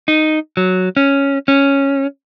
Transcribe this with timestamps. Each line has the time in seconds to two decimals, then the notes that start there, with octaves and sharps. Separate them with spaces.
0.08 D#4
0.57 F#3
0.97 C#4
1.48 C#4